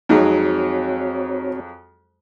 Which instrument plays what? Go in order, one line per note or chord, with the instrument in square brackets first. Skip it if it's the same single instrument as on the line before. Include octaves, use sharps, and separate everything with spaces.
[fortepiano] F2 F#3 G#3 [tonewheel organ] C4 F#4 C#5 [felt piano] D#4